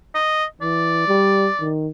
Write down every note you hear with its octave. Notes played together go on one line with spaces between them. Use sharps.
D#5
E3 D5
G3
D#3